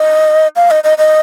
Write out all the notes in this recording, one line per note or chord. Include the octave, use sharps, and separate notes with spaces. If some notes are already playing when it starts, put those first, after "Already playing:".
Already playing: D#5
F5
D#5
D#5
D#5